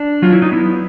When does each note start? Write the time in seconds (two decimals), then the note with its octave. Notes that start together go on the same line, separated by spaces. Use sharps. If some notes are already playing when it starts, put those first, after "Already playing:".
Already playing: D4
0.22 F#3 F4
0.32 E4
0.42 D#4
0.52 B3 E4